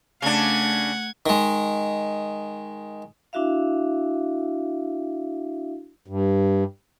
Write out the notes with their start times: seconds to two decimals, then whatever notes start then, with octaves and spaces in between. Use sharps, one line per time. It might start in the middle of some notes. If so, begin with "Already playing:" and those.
0.22 C#3 A3 D4 F#5 G#6
1.26 D#3 G#3
3.33 D4 E4 F#4 E5 F5
6.07 G2